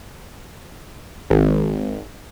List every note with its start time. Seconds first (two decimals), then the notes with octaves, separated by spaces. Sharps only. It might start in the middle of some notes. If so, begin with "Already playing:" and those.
1.30 G#1